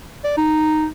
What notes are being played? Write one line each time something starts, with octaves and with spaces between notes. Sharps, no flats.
D5
D#4